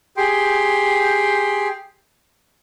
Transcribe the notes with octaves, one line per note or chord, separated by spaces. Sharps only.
G4 G#4 G5 C6